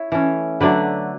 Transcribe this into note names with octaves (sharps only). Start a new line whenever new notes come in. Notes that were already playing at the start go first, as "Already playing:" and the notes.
Already playing: E4 C#5
E3 A3 C#4
D3 F#3 A3 D4 B4 D5